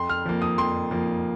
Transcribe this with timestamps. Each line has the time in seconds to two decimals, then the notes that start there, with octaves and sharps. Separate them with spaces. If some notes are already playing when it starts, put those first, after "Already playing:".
Already playing: F2 C6
0.09 F6
0.25 F3 A#3
0.42 D#6
0.58 F2 C6
0.91 F3 A#3